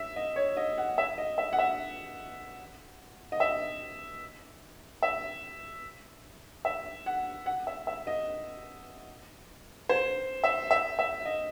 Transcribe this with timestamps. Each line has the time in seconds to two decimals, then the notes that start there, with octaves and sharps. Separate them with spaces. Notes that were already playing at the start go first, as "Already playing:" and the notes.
Already playing: E5
0.16 D#5
0.36 C#5
0.57 D#5
0.78 F#5
0.98 E5
1.18 D#5
1.38 E5
1.53 F#5
1.59 E5
3.32 D#5
3.40 E5
5.02 E5
6.65 E5
7.06 F#5
7.46 F#5
7.67 E5
7.87 E5
8.07 D#5
9.89 C5
10.44 E5
10.71 E5
10.99 E5
11.25 D#5